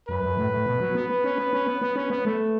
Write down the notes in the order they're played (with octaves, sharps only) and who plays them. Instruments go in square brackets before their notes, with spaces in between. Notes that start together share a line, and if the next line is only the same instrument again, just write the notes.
[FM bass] F#2 [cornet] B4
[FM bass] F#2
A2
A2
B2
F#3
B3
B3
C#4
B3
C#4
B3
B3
C#4
B3
A3